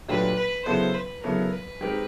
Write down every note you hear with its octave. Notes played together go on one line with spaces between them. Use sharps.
A#2 F#3 A3 D4 G4 B4
B4
C#3 F#3 B3 E4 A4 C5
B4
C#3 F#3 B3 E4 A4 A#4
B4
G#3 C4 D#4 G4 A#4